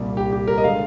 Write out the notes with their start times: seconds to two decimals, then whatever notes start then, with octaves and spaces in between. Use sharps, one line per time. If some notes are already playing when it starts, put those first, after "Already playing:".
Already playing: C2 A#2 G3
0.17 G4
0.32 G4
0.48 A#4
0.58 D#5
0.64 D3 G#3 F5